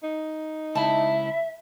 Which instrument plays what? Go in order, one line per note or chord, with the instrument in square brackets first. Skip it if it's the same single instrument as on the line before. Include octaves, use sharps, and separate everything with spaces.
[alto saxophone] D#4
[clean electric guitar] C#2 E4 [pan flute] E5 [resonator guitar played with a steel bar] A5